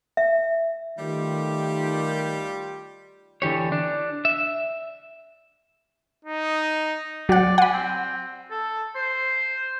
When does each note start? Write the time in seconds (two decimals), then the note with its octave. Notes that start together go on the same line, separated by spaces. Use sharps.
0.17 E5
0.99 D#3 G3 A3 F4 G4
3.42 D3 E3 G4 C#5
3.72 D4
4.25 E5
6.25 D#4
7.29 F#3 D5 F#5
7.58 F#5 G#5 B5
7.73 C4
8.51 A4
8.95 C5